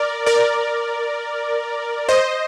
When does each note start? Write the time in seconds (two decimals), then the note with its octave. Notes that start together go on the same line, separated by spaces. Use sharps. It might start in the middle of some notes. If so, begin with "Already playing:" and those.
Already playing: A#4 D5
0.26 A#4 D5
2.09 C5 D#5